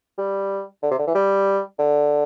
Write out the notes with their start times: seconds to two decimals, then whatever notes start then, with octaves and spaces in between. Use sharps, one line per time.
0.18 G3
0.83 D3
0.91 C3
0.99 D3
1.07 E3
1.15 G3
1.79 D3